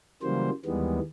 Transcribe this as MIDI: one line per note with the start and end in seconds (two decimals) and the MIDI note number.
0.22 0.50 49
0.22 0.50 52
0.22 0.50 54
0.22 0.50 55
0.22 0.50 58
0.22 0.50 72
0.66 1.00 39
0.66 1.00 51
0.66 1.00 52
0.66 1.00 55
0.66 1.00 56
0.66 1.00 59